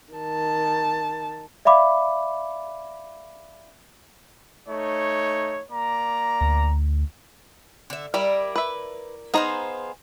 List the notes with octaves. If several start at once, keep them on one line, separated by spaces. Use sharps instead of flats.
D#3 A5
D5 E5 F5 B5 D6
A3 D#4 C#5
A#3 D5 A#5
D2
D3 E5
G3 E4 A#4 D5
B4 E5
B3 D#4 G#4 C5 F5 A#5